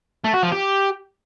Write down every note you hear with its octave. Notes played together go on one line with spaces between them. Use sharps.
A3
F#4
F3
G4